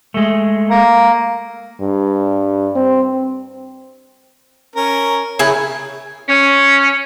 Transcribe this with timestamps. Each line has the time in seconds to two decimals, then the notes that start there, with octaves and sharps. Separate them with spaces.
0.14 G#3 A3
0.69 A#3
1.81 G2
2.76 C4
4.76 C#4 A#4
5.39 C#3 E4 G#4 C#5
6.28 C#4